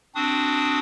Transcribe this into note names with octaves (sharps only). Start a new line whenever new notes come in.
C4 D4 F#4 D#6